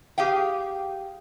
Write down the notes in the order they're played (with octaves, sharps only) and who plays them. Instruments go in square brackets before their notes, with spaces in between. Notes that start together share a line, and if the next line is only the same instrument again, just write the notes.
[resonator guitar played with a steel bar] G4 G#4 F5 G5